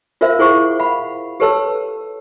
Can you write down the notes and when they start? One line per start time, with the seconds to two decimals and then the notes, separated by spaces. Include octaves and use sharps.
0.21 F4 A#4 C5 E5 F5
0.39 E4 G#4 C5 F5 F#5 C#6
0.80 F5 F#5 B5
1.40 G4 A4 B4 C#5 A5 E6